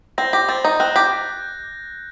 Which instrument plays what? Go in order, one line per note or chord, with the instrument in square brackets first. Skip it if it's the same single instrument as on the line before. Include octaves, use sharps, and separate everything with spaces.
[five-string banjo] C4 [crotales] A#6
[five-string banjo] G4 [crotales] A#6
[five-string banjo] C4 [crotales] A6
[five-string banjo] D#4 [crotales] G6
[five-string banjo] C4 [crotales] F#6
[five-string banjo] G4